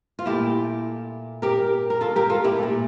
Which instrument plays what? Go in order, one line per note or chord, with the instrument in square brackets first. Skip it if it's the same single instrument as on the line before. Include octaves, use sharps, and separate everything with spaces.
[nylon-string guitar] F4
A#2 A3 E4 G4
G4 A#4
A#4
F4 A4
G4 A#4
F4 A4
E4 G4
A#2 A3